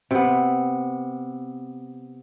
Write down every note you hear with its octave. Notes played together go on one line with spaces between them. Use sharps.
C3 B3